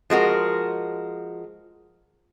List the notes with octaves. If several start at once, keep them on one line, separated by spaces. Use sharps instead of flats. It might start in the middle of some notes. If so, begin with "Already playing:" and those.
F3 G#3 F#4 A#4